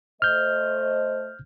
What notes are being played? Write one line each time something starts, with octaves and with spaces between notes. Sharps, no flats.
A3 C5 D#5 F6 G6